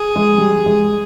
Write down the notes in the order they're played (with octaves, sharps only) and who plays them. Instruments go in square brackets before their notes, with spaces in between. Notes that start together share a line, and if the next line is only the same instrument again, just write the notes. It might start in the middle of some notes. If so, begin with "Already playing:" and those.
Already playing: [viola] G#4
[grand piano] G#3
G3
G#3